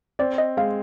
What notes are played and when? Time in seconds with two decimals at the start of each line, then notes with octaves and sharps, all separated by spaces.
0.19 C4 D5
0.38 D#5
0.57 G#3 F5